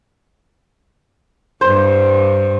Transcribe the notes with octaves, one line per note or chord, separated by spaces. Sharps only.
G2 C5